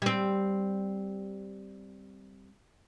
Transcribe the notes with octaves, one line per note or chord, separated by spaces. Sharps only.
G3 C4